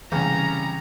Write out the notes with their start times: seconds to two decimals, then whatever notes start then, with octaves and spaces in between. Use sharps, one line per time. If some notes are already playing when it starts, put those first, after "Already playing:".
0.12 C2 C#3 E3 C#4 A#5